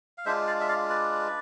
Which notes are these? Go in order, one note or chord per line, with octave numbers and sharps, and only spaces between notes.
F5
G#3 D4 F4 C5 E5
D5 F5
E5
D5 F5
B4 D5